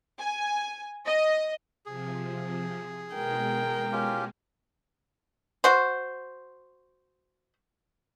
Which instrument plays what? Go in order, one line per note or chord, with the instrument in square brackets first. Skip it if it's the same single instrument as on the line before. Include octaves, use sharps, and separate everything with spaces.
[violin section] G#5
D#5
[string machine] C3 F3 [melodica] G#4
[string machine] B2 G#3 [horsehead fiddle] A#4 G5
[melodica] C#4 F4 G4
[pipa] F#4 C5